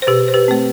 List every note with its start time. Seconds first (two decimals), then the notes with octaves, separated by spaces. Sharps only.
0.02 C5
0.07 B2 G4 B4
0.28 C5
0.34 G4 B4
0.48 A3 C4